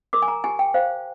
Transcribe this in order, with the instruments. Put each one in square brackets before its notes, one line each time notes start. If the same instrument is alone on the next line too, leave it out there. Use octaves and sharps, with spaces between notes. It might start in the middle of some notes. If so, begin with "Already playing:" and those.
[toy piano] A#4 D6
G#5
A#5
G4 G#5
G5
C5 F5